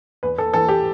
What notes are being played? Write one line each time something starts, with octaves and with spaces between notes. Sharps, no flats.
E2 B4
A4
E3 A4
G4